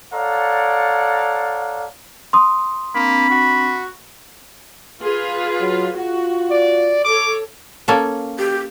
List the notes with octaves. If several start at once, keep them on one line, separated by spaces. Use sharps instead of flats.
A4 C#5 D5 F5 F#5 A#5
C6 D#6
A#3 C4 D4 B5
F#4
F4 G#4 B4
F#3
F4 F#4
D5
A4 C#5 D6
A#3 C#4 A4
G4